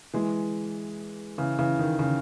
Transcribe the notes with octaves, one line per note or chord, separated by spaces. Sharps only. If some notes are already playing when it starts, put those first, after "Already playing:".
E3 G#3
C#3 E3
C#3 E3
D#3
C#3